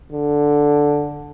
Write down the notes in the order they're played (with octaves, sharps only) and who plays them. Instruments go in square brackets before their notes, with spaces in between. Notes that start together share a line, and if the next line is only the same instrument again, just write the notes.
[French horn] D3